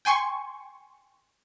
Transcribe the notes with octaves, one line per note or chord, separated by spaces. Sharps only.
G5 G#5 C6 C#6